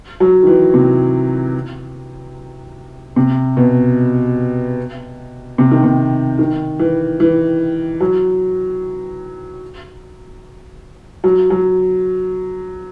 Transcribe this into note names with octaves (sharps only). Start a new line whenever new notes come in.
F#3
D#3
E3
C3
C3
B2
C3
D#3
C3
D#3
E3
E3
F#3
F#3
F#3